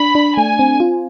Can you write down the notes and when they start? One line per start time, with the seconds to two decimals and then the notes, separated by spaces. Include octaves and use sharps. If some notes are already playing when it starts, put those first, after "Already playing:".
Already playing: D4 B5
0.15 D4
0.36 A3 G#5
0.59 C4
0.80 F4